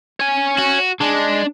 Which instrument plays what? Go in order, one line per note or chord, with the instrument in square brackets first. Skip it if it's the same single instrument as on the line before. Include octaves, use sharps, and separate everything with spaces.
[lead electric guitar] C#5 G#5
[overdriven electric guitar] F#4
[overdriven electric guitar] G#3 [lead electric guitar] D4